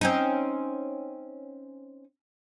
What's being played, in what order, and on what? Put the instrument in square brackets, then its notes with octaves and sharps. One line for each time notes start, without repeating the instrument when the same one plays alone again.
[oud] C4 C#4 D#4